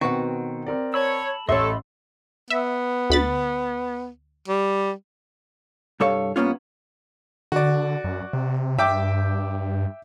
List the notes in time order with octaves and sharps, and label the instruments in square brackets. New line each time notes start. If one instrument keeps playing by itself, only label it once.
[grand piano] B2 C4 [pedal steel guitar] D#3 [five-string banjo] F#4 B4 F#5
[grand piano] C4 A#4 D5
[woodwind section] C#5 [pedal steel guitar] A5 B5 E6
[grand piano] A1 C6 [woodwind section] A3 A4 [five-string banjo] C#5 E5 [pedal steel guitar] D#5 B5
[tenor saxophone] B3 [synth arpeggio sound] E5
[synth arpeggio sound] D2 B5 A6
[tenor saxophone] G3
[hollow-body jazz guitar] C2 G2 A4 C#5 F5
G2 A#3 B3 C#4 F4
[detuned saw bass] D3 [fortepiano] F#4 D5
[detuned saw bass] F#2
C3
[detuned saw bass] G2 [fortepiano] E5 G5 D6